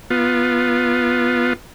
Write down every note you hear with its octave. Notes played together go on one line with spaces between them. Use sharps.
B3 F4